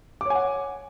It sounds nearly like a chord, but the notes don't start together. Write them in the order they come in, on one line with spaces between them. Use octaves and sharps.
D6 C#5 G#5 F#5